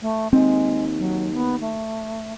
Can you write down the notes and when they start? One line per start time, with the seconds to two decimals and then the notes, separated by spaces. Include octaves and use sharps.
0.01 A3
0.33 D#2 G#3 C4
0.98 F#3
1.33 B3
1.61 A3